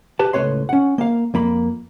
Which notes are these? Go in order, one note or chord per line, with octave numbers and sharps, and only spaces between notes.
G4 B4 A5
C#2 A2 B4 C#5 C6
C#4 F#5
A#3 F5
F2 A#3 B5